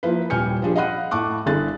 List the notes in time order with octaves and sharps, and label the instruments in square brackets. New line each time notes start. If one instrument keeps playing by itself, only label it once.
[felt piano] F3 A#3 E4 B4
D#1 G3 G#5 F6 G6 C#7
F3 G3 D4 G#4
D#5 F5 F#5 B5 F#6 D#7
A2 A5 C#6 D6 F#6
G1 D3 E4 G#4 F#6 A6